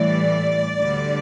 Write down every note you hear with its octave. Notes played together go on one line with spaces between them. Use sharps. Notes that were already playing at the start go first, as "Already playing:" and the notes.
Already playing: A2 E3 G3 D5
D2 D3 G3